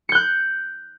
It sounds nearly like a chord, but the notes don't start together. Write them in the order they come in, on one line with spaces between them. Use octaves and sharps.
C#7 G6 F#6